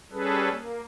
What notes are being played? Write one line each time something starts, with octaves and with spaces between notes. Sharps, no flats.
G3 C#4 G#4 A4 B4
A#3